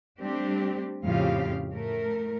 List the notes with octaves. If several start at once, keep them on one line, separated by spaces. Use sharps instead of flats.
G3 A3 C4 D4 G4
F2 A2 C#3 F4 G4 F5
A2 A3 A#4